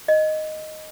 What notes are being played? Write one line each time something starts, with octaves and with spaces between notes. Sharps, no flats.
D#5